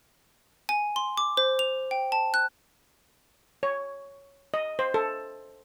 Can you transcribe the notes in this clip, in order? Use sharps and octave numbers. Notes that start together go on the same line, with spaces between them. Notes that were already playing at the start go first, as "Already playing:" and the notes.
G#5
C6
D6
C5
F7
G5
A5
F#6
C#5
D#5
C5
A4